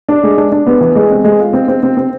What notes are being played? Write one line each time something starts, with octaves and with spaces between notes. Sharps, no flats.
D4
G#3
D4
D4
B3
E3
G#3
C4
G#3
F4
C4
C4
C4
C4